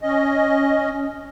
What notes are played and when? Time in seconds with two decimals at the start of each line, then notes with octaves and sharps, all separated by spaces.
0.02 C#4 D#5